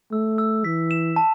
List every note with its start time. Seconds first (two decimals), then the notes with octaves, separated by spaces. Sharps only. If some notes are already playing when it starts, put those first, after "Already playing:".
0.12 A3 E6
0.38 E6
0.64 E3 B6
0.91 E7
1.16 A5